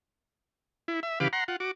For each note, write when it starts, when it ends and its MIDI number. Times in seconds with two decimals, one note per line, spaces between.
0.88 1.00 64
1.03 1.19 76
1.20 1.28 49
1.20 1.28 52
1.20 1.28 67
1.20 1.28 71
1.20 1.28 77
1.20 1.28 86
1.33 1.44 78
1.33 1.44 82
1.33 1.44 84
1.48 1.56 65
1.48 1.56 78
1.60 1.71 66
1.60 1.71 86